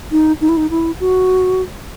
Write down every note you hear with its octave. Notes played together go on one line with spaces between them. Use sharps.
D#4
D#4
E4
D#4
E4
F#4